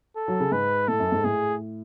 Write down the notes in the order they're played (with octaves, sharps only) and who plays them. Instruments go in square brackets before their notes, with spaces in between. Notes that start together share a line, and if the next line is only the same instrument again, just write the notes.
[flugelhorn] A4
[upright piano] F#3
C#3
[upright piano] G#2 [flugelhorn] B4
[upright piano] A2 [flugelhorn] A4
[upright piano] F#2
G#2
[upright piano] A2 [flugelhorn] G#4